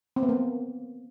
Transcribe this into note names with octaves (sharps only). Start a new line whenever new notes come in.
C4
B3
A#3